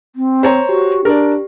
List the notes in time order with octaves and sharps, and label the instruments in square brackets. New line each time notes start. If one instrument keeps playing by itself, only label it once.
[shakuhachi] C4
[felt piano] C5 C#5 A#5
[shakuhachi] F#4 [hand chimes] G4
[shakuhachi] D4 [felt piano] A#4 D5